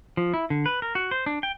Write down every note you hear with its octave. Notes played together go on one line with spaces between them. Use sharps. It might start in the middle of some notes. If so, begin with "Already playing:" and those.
F3
E4
D3
B4
A#4
F#4
C5
D4
G5